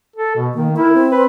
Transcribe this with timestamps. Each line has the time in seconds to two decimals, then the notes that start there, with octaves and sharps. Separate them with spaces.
0.16 A4
0.36 B2
0.54 D#3 A#3
0.77 E4 A#4
0.93 C4
1.12 B4